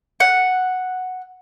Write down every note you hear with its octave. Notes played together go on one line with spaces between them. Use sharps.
F#5